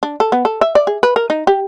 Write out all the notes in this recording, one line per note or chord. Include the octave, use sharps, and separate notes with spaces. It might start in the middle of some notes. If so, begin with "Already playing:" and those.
D4
A4
B3
A4
E5
D5
G#4
B4
A#4
D#4
G4